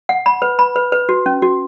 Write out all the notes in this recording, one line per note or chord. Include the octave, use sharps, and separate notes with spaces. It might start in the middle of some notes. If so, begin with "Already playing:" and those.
F#5
B5
B4
B5
B4
B4
F#4
C#4
F#4